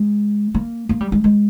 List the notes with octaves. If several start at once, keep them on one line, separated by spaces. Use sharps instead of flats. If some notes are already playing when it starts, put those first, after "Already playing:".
Already playing: G#3
A#3
A#3
G3
G#3
G#3